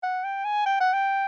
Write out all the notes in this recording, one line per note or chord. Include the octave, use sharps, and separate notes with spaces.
F#5
G5
G#5
G5
F#5
G5